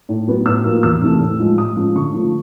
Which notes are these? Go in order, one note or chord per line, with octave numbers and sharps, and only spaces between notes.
A2
F#3 B3
A2 E6
F3 A#3
E2 E6
C3 E3 A3
A2
F3 G#3
A2 D#6
F3 G#3 C#4
D3 C#6
F3 A3